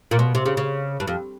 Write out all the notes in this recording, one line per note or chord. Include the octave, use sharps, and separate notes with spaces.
A#2
B2
C3
C#3
C#3
G2
F2